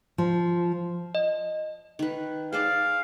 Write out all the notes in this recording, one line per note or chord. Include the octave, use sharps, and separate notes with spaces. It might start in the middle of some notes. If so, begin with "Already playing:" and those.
F3
D#5
D#3 B4
G#4 C5 D5 F5